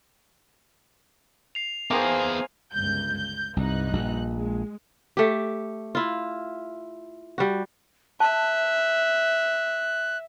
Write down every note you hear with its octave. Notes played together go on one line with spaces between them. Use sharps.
C7 F7
D#3 F3 A#3 B3 G#4 C5 G#5
G1 C#2 G6
G6
C2 G2 D#4 F#6
A#1
G#3
A3 G4
E4 F4
G3 F#4
E5 A5 F#6